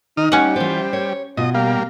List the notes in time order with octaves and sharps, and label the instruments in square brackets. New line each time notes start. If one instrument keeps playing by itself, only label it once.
[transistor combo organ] D#3 D#6 F6 [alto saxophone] D#4
[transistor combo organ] G3 [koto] C#4 F#5
[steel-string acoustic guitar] E3 F4 [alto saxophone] C5
[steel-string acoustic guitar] C#5
[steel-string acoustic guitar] B2 [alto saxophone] F4 [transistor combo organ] D#5
[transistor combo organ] G3 A#3 [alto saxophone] F5